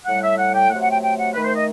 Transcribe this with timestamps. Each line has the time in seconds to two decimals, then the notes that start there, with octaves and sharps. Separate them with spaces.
0.06 A2 G3 F#5
0.23 E5
0.38 F#5
0.55 G5
0.70 C3 F#3 A3 F#5
0.81 F#5
0.91 G5
1.02 G5
1.19 F#5
1.34 D#3 A3 B4
1.44 C5
1.56 D#5